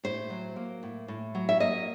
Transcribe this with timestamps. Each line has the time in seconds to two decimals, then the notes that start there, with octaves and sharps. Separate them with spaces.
0.04 A2 C5
0.30 F#3
0.56 A#3
0.83 A2
1.08 A2
1.35 F#3
1.49 E5
1.60 A#3 D#5